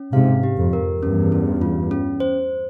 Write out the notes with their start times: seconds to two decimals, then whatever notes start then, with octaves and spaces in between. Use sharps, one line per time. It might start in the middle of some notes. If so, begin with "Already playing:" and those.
Already playing: C#4
0.13 G#2 C3 F5
0.43 G4
0.57 F2
0.73 A#4
1.02 E2 G2 C#4
1.32 C#4
1.61 F4
1.91 C#4
2.20 C5